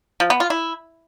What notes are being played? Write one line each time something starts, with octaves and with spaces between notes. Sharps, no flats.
F3
B3
F4
E4